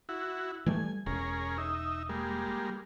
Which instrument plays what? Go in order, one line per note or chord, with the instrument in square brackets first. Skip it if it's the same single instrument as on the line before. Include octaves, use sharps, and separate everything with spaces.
[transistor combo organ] E4 F#4
[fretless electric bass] E3 G3 A3 [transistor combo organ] G#5
[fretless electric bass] E1 [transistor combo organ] C#4 G#4 A#4
[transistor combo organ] D#4 E5
G3 G#3 A#3